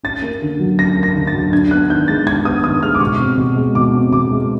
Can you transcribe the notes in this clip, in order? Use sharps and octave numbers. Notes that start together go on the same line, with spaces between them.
C#4 A6
A#3
D3
F#3
C#4 A#6
A#3
A#6
D3
A6
F#3
D4 G#6
B3 F#6
D#3 G6
G#3 A6
D4 G#6
B3 D#6
D#3 D#6
G#3 F6
D6
B2 C#6
C4
B2
G#3
B2 D6
C4
B2 D6
G#3